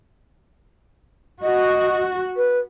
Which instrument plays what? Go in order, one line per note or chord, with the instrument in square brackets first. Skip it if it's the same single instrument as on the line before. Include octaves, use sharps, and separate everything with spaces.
[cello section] F#4 [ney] D#5
[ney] B4